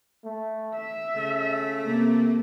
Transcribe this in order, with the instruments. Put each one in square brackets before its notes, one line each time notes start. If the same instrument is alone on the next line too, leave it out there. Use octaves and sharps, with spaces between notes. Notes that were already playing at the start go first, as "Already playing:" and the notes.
[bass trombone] A3
[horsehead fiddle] E5
[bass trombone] C#3 [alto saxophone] A3
[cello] C3 A#3